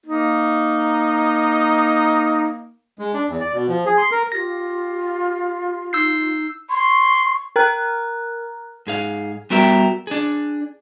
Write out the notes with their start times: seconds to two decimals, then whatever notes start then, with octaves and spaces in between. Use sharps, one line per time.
0.06 A#3 D#4
2.99 G#3
3.14 D4
3.29 E2
3.40 D5
3.53 B2
3.68 F3
3.86 G#4
3.98 C6
4.11 A#4
4.32 F4 G4 A#6
5.93 D#4 E6 G6 C7
6.69 C6 C#6
7.56 A#4 A#5 F6 F#6
8.87 G#2 G#4 F5
9.50 G3 B3 F#4 G4 A#4 E5
10.07 D4 G#4